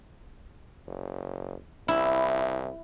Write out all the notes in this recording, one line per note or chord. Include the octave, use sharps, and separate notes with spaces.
F#1
C2 E4